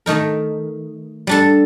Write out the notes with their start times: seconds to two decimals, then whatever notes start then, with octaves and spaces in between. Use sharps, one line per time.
0.06 D#3 A3 D#4 A#4
1.27 G3 D4 A4